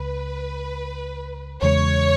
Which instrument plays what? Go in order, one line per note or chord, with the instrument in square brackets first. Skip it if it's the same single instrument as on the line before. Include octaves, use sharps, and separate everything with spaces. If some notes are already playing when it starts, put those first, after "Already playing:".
Already playing: [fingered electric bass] C#2 [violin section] B4
[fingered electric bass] E2 C#3 G#3 [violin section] C#5